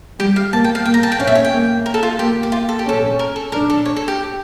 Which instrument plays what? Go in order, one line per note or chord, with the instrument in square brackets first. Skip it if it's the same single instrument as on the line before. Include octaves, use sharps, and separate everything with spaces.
[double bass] G3 [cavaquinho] G4
[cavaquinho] F5
[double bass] A#3 [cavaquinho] A5
[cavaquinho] G5
F5
[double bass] A#3 [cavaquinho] G5
[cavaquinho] A#5
A5
G5
[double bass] C#4 [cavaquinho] F5
[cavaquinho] E5
C#5
G5
[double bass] A#3
[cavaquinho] A#4
A4
F4
[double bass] A#3 [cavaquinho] G4
[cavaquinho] G4
F4
A4
G4
[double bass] C#4 [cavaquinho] A4
[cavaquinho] A#4
A4
[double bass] D4 [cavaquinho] A#4
[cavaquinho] A4
C#5
A4
G4